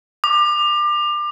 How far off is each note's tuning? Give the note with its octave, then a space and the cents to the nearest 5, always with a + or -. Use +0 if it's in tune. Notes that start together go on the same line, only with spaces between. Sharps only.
D6 +30